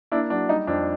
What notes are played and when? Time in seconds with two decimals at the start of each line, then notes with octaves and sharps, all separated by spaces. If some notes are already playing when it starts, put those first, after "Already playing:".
0.12 A#3 D4 E4
0.30 F#3 D4
0.49 G3 D#4
0.67 F2 D4